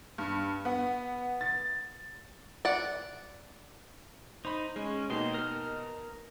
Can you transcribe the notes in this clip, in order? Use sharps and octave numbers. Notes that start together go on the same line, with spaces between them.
G2
B3
A6
D5 F#5
D#4 C5 B5
G#3 C#4
B2 A#3 D#4 G4 C6
A#4 F6